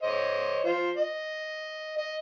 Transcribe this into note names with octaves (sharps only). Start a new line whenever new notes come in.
C5 C#5 D#5
F4 C5
D#5
D#5